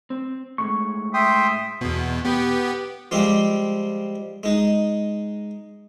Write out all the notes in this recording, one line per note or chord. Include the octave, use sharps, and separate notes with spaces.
C4
A2 G#3 C#6
E5 G5 C6 D#6
E2 B2
B3 G4
F3 G3 G#3 C4 G4
G#3 D#4